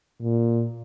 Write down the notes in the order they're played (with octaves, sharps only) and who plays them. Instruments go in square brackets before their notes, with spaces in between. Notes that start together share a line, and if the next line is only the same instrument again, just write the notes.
[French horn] A#2